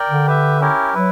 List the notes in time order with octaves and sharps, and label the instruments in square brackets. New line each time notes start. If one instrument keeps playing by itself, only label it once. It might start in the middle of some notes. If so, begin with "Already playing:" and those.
Already playing: [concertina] A#4 D5 G5
[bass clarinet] D3
[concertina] G4 B4 E5
C#4 E4 G4 A#4
[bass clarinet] F#3 [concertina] E4 B4